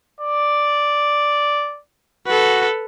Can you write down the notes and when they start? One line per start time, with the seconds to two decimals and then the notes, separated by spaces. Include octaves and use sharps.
0.20 D5
2.27 F#4 A4 B4